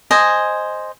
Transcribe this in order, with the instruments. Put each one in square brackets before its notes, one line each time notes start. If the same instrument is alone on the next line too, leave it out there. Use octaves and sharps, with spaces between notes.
[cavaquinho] C5 D#5 G#5